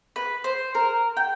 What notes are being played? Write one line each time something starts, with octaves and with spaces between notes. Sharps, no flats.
B4
C5
A#4
G5